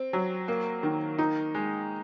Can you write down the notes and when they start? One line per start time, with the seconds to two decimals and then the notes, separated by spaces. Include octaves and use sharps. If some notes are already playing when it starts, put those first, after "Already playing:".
Already playing: C4
0.13 F#3
0.48 A#3
0.83 D#3
1.18 D#4
1.54 G#3